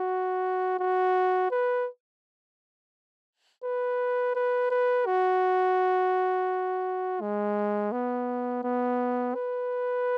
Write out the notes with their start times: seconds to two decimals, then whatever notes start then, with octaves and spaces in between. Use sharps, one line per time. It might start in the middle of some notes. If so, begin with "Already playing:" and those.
Already playing: F#4
0.79 F#4
1.51 B4
3.64 B4
4.35 B4
4.71 B4
5.06 F#4
7.21 G#3
7.92 B3
8.64 B3
9.35 B4